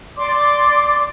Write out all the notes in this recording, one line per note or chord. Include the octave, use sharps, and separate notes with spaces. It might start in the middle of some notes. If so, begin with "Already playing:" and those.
D5 C6 D6